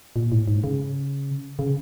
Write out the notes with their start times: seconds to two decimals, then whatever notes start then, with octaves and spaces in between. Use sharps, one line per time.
0.16 A#2
0.32 A2
0.48 G#2
0.64 C#3
1.59 C#3